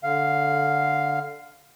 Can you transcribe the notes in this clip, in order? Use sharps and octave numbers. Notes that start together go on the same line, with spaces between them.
D3 F5